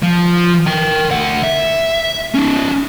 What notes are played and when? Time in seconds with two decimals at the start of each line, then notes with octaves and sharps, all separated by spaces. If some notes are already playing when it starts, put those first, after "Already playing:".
0.03 F3
0.67 A#4 G5
1.11 D2 F#5
1.43 E5
2.35 C#4 D#4